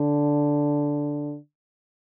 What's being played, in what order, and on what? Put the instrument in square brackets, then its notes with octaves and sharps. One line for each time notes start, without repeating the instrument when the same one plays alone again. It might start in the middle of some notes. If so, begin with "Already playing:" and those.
Already playing: [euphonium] D3